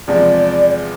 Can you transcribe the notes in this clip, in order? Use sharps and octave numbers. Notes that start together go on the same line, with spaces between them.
E2 C3 F3 G#3 D5